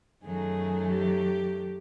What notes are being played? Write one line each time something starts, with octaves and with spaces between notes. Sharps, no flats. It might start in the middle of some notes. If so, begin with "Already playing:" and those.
F#2 D#3 F#3 A3 G#4
G4